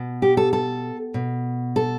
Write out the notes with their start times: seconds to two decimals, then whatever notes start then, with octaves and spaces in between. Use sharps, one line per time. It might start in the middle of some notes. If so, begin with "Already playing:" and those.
Already playing: B2
0.22 G4
0.37 A4
0.53 A4
1.14 B2
1.76 A4